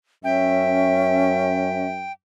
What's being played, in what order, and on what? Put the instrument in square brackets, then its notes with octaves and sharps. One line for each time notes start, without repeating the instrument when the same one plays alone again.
[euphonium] F#2 [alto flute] C#4 [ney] E5 [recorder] G5